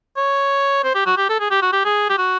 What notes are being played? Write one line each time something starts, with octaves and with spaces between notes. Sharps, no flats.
C#5
C5
G4
F#4
G4
A4
G#4
G4
F#4
G4
G#4
G4
F#4